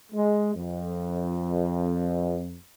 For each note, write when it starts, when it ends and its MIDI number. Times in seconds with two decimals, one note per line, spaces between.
0.13 0.52 56
0.55 2.54 41